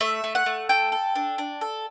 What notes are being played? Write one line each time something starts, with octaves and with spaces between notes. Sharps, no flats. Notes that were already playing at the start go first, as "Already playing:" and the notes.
A3 E5
A3
F#5
A3
A4 G5
A4
D4
D4
A4